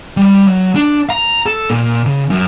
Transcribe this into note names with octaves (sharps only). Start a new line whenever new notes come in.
G3
F#3
D4
A#5
A4
A#2
C#3
F#2